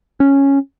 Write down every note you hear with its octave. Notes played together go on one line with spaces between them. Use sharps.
C#4